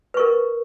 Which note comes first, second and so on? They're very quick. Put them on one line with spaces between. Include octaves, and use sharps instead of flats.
B4 C#6 A#4